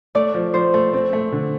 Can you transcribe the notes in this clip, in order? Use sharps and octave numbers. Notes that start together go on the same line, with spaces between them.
A3 D5
F3
F3 C5
A3
C4
A3
D3